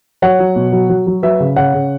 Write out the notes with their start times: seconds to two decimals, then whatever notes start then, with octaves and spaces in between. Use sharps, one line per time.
0.22 F#3 C#5 F#5
0.39 F#3
0.56 B2
0.72 F#3
0.89 F#3
1.07 F#3
1.23 F#3 B4 E5
1.40 C#3
1.56 C#3 C#5 F#5
1.74 C#3